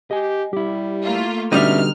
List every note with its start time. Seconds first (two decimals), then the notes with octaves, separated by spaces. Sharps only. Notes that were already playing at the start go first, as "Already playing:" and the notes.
0.11 G4 D#5 G#5
0.53 G3 E4 G4
1.05 A3 A#3 F4
1.53 B2 D3 G3 C#4 D#4 D5 E5 F6